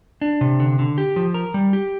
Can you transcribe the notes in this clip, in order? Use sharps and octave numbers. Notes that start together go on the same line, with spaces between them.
D4
C3
D3
D3
G4
F3
A#4
G3
G4